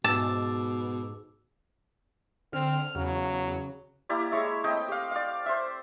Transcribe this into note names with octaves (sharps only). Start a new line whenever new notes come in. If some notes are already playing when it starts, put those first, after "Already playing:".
G#2 B2 A5 D6 E6
D3 C4 F6
E2 C#3 F#3
A#3 E4 G4 D5
G#3 C#5 E5
A3 C4 D#5 G5
G4 F5
D5 F5
C5 E5